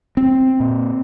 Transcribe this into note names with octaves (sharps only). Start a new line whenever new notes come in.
C4
A#2